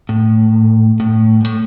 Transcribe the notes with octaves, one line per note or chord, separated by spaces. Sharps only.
A2
A2
G#2
A2